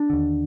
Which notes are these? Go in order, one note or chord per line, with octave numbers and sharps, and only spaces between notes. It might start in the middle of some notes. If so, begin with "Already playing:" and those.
Already playing: D4
D#2 D3